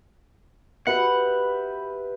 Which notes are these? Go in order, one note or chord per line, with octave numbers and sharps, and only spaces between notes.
G4 B4 E5 F#5